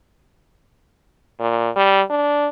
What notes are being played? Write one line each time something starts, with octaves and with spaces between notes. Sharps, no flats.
A#2
G3
D4